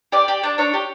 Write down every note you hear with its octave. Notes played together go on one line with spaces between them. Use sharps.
G4 D5
G4
D4
D4 C#5
G4